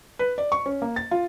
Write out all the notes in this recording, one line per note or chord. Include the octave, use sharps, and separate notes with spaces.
B4
D5
C#6
C#4
A#3
A6
F4